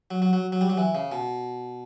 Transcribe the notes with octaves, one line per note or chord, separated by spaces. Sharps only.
F#3
F#3
F#3
F#3
G3
F#3
E3
C#3
B2